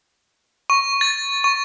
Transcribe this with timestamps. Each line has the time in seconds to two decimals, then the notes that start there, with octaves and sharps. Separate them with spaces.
0.70 C#6
1.01 A6
1.44 C#6